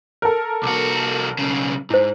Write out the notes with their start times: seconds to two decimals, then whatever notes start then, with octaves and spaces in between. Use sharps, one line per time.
0.22 A4 A#4
0.63 C2 F#4 D6
1.39 B1 C#3
1.90 G#2 E4 C5